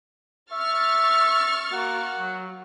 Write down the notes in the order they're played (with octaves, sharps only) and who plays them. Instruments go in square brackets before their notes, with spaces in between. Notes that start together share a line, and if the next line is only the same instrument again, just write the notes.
[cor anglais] E5 [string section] C#6 F6 A6
[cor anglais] A#3 [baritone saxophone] F#4
[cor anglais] F#3